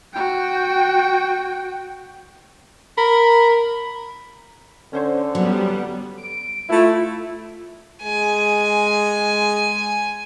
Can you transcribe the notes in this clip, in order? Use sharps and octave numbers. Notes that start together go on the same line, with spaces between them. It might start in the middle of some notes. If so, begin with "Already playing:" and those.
F#4 G5
A#4 B5
D3 C#4 C5 C#5
F#3 G3 B3
D7
A3 E4 F4
G#3 G#5